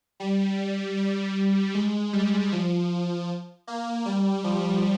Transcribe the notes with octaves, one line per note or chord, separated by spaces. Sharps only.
G3
G3
G#3
G3
F3
A#3
G3
F3